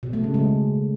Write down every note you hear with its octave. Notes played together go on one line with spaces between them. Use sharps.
B2
A3
C#3
G#3